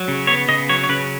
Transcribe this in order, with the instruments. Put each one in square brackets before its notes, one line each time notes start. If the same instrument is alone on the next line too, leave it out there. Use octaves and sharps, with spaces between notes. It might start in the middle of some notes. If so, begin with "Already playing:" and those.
Already playing: [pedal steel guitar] F#3
C#3
B3 C#5
C#3 D#5
F#3 C#5
C#5
C#3 B4